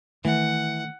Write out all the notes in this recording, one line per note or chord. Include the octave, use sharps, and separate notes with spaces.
D#3 E3 A3 F#5